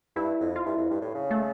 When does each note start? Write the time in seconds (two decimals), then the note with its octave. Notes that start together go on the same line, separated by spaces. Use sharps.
0.16 G2 E4
0.41 F2
0.56 F4
0.65 G2 E4
0.77 F2
0.91 G2
1.02 A2
1.15 C#3
1.31 A3